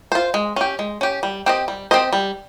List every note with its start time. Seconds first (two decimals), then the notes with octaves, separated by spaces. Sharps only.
0.12 F4 C5
0.34 G#3
0.56 C#4 G4
0.79 G#3
1.01 C#4 G4
1.23 G3
1.46 C4 G4 C5 D#5
1.68 G3
1.91 C4 G4 C5 D#5
2.13 G3